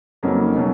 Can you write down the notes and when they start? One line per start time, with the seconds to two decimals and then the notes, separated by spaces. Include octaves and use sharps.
0.23 F2 C#3 F#3 A#3 D#4
0.56 B2 F#3